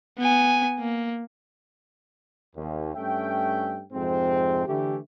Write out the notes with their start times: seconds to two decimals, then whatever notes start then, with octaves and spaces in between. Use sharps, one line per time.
0.19 B3 G#5
0.80 A#3
2.56 D#2
2.95 G2 A3 C#4 E5 G5
3.93 F2 G#2 C3 G#3 C4
4.67 D3 E3 A3 E4 G4